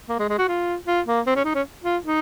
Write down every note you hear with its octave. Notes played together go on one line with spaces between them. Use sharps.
A#3
G#3
G#3
F#4
F4
F4
A#3
C4
C#4
D#4
C#4
F4
D#4